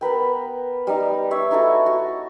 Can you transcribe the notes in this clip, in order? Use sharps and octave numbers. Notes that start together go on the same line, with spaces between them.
B3 A#4 B4 G5
G3 D#4
C#5 E5
D#4 E4 F#4 A4
F#4